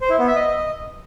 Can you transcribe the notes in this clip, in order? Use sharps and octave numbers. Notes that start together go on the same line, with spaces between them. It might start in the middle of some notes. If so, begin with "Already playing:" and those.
C5
E4
B3
E5
D#5